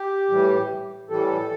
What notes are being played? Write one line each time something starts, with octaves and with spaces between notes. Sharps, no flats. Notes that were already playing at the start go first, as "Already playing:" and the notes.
Already playing: G4
A2 E3 G3
A2 E3 G3 A4